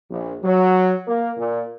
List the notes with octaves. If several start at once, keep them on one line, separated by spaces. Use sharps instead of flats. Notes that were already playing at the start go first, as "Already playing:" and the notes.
A#1
F#3
A#3
A#2